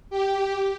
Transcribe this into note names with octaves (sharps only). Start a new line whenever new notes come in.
G4